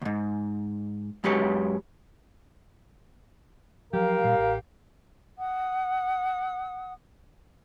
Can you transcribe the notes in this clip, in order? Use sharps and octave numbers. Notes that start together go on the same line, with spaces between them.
D2 G#2
F#2 G#3 G4 B4 C#5
F3 F#3 G4 A#4 F5
A#2 G3
A1
F#5 D#6